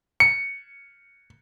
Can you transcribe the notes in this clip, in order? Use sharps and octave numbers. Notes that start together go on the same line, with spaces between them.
C#7